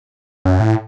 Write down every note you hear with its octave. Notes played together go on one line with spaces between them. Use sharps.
F#2
A2